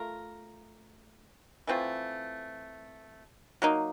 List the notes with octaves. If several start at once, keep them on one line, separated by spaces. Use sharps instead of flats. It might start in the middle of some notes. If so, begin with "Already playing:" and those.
Already playing: A3 F4 A#4
E3 A3 C4 F4
F#3 A#3 D#4